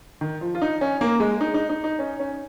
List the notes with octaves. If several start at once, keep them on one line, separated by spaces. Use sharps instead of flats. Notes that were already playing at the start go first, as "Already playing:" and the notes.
D#3
F3
F4
D#4
C#4
A#3
G#3
D#4
D#4
D#4
D#4
C#4
C#4